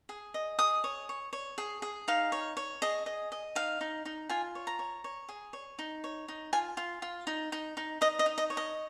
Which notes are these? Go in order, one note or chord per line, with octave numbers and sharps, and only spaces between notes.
G#4
D#5
G#4 D#6
C#5
C#5
C#5
G#4
G#4
D#4 F5
C#5
C#5
G#4 D#5
D#5
D#5
D#4 F5
D#4
D#4
F4 G#5
C#5
A#5
C#5
C#5
G#4
C#5
D#4
C#5
D#4
F4 G#5
F4
F4
D#4
D#4
D#4
D#4 D#5
D#5
D#4
D#5
C#5
D#5